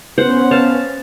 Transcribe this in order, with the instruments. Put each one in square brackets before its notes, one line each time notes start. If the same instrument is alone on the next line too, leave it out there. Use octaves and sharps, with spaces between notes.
[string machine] B3 C#4 [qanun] C5 F#5
[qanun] F5 A5